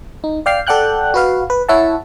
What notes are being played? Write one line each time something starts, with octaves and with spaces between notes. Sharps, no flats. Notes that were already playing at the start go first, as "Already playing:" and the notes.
D#4
D5 F5 G5 F6 C7
A4 D5 F#5 G5 F#6 G6
F#4 B4 F5
B4
E4 C#5 E5 F#5 A5